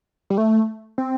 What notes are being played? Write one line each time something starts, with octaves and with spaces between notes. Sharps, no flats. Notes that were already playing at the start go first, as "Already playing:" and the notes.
G3
A3
C4